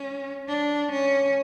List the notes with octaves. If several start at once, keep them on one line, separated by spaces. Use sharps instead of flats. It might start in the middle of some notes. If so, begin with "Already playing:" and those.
Already playing: C#4
D4
C#4